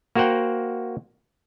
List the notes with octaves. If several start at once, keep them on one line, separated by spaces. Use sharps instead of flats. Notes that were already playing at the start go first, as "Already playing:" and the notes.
A#3 F#4 A#4 C5 F#5 G5